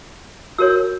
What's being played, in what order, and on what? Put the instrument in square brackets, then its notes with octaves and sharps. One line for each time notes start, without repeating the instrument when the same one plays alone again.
[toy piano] F#4 A#4 C#5 E6